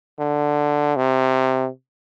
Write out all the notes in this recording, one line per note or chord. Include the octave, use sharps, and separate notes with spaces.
D3
C3